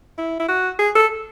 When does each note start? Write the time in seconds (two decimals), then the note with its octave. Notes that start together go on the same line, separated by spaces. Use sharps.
0.18 E4
0.40 E4
0.48 F#4
0.79 G#4
0.95 A4